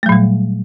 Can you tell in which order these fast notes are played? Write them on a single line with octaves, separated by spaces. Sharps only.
A3 F#3 A#2 G3